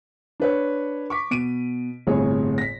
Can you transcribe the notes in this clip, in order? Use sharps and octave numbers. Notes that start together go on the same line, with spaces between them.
D4 B4 C#5
C#6 D6 B6
B2 D7 D#7
G1 A2 C3 G#4 C#5
A#6 B6